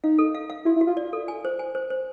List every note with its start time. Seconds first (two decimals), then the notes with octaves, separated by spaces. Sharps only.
0.04 D#4 F5
0.18 A4
0.35 F5
0.50 F5
0.65 E4 F#4
0.76 E4
0.81 F#4
0.87 F4
0.97 D5
1.13 A4
1.28 G#5
1.45 C5
1.59 G#5
1.75 C5
1.90 C5